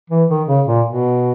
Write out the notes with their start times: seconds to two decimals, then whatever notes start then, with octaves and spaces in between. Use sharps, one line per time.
0.10 E3
0.29 D#3
0.47 C#3
0.67 A#2
0.86 B2